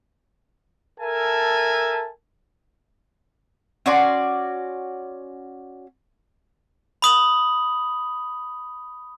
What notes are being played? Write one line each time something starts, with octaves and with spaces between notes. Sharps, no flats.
A4 A#4 E5 G#5 A5
C#4 F#4 D5 C6
B5 D#6 F#7